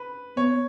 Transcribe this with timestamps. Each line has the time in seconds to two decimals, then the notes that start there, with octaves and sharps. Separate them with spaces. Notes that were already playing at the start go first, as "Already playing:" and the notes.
Already playing: B4
0.37 B3 C#5